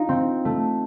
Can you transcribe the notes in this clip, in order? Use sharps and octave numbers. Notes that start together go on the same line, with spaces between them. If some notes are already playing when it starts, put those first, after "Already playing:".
Already playing: D#4 F4
C4
A3